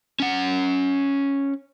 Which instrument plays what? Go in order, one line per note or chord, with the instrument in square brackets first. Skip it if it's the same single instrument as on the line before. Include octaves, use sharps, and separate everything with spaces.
[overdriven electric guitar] C#4 F#5